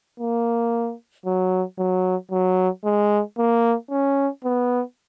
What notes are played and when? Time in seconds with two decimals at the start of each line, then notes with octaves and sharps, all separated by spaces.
0.20 A#3
1.26 F#3
1.79 F#3
2.31 F#3
2.85 G#3
3.38 A#3
3.91 C#4
4.45 B3